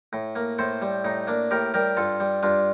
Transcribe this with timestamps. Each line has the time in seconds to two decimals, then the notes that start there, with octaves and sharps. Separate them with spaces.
0.13 A2
0.36 A#3
0.59 A2 A4 C5
0.82 G3
1.04 A2 D#4
1.27 A#3 D4
1.51 A2 G4 A#4
1.74 G3 G4 A#4
1.97 G2 F4 A4
2.20 G3
2.43 G2 D4 F4